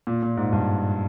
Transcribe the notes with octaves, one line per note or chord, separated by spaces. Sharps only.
A#2
A#2
G#2
G2